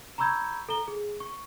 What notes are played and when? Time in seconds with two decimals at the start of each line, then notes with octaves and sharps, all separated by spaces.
0.18 A#5 B5 C#6 E6 G6 G#6
0.69 A4 A#5 G7
0.88 G#4
1.20 C#6